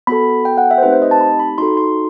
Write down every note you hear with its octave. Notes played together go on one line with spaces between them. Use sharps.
B3 F#4 A4 B5
G5
F#5
E5
C5
A3 C4 D#4 G4 B4
C5
D#5
A5
B5
B5
D#4 F#4 A4 C6
C6